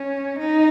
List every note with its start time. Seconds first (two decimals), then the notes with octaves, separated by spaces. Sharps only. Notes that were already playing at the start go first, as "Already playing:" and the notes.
Already playing: C#4
0.39 D#4